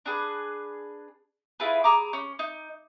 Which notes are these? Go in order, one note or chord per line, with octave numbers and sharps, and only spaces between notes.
D4 G#4 B4
E4 F4 G#4 B4
G#4 A#5 D6
C#4
D#4